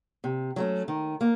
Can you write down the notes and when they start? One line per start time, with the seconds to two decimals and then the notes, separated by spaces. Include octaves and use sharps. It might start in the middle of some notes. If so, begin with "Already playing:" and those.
0.24 C3
0.56 F#3 A3 C#4
0.88 D#3
1.21 A#3